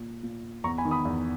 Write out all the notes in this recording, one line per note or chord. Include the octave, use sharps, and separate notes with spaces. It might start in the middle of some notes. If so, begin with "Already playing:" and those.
Already playing: A#2
A#2
E2 A#5 C#6
G#5 B5
D#3
B5 D#6
E2